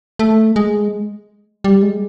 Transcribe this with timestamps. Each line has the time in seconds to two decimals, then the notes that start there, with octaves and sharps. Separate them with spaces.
0.19 A3
0.56 G#3
1.64 G3
1.82 G#3